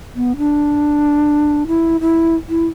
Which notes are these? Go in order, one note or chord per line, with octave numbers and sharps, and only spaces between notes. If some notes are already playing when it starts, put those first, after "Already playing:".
B3
D4
E4
E4
E4